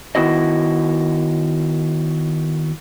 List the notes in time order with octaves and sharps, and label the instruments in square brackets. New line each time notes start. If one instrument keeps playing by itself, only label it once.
[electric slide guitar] D#3 B3 E4 F#4 D#5